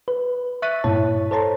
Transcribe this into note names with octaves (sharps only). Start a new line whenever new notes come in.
B4
E5 C#6 F#6 A6 B6 D#7
G2 A#2 E4 C#5 A5
A4 C5 C#5 A5 A#5 C6